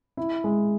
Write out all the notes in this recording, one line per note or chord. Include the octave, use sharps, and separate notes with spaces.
E4
G#3